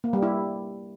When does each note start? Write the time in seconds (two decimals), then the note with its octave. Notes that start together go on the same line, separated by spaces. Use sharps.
0.04 A#3
0.13 G3
0.22 E4